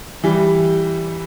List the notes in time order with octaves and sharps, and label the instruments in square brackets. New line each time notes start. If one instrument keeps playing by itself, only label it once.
[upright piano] E3 G3